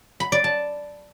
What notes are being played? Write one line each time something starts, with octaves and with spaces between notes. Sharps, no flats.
B5
D5
A5